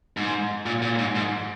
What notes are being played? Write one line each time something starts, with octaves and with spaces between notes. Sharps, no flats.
G#2
A#2
A#2
G#2
G#2